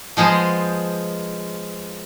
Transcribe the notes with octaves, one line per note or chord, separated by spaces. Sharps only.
F3 G#3 B3 G#4 C5